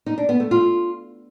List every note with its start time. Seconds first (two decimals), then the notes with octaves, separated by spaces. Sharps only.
0.06 D#4
0.18 D4
0.29 B3
0.40 A3
0.51 F4